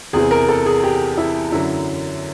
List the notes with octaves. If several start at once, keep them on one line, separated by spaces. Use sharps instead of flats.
E2 C3 E3 G#4
A#4
A4
G#4
G4
E4
F#2 D3 F#3 E4